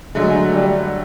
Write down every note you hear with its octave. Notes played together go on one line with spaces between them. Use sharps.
D3 F#3 G#3 A3
G3